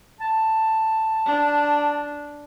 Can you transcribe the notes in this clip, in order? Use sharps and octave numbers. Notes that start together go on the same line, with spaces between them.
A5
D4